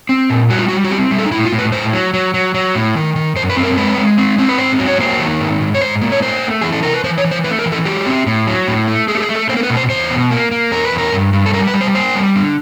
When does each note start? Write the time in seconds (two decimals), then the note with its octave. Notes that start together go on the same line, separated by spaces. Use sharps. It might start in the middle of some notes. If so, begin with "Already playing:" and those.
0.09 C4
0.30 A#2
0.50 G3 F#4
0.59 F4
0.68 G3 F#4
0.84 F#4
0.91 C4 G4
1.11 G3
1.18 A4
1.26 D#4
1.32 A2 E4
1.45 F4
1.52 A2
1.59 B4
1.72 A2 C5
1.93 F#3
2.14 F#3
2.34 F#3
2.54 F#3
2.75 A2
2.95 D#3
3.16 D#3
3.36 F#2 C5
3.50 B4
3.57 C4
3.63 A#4
3.77 G#3 B4
3.97 G#3
4.18 C4
4.38 C4
4.49 B4
4.59 G#2 C5
4.79 F#3
4.88 C#5
5.00 A#3 C5
5.20 D#3
5.40 G#2
5.61 G#2
5.74 C#5
5.81 G#2 C5
6.01 A#3
6.12 C#5
6.22 A3 C5
6.43 A3
6.61 E3 G#4
6.73 A4
6.83 C3 A#4
6.93 B4
7.04 E3 C5
7.18 C#5
7.24 E3
7.31 C5
7.44 A3 B4
7.59 A#4
7.66 E3
7.72 A4
7.85 F#3 G4
8.06 C4
8.27 A2
8.47 F#3
8.68 A2
8.88 A3
9.08 A3 G#4
9.17 G4
9.22 G#4
9.29 A3
9.35 A4
9.49 A#3 C5
9.57 A#4
9.63 B4
9.70 B2
9.77 C5
9.90 E2 C5
10.10 B2
10.31 A#3
10.51 A#3
10.72 E2 A#4
10.85 B4
10.92 E2
10.98 A#4
11.12 G2
11.33 G2
11.46 A4
11.53 G3 A#4
11.67 B4
11.74 G3
11.81 C5
11.95 A#3 C5
12.15 G3
12.35 D3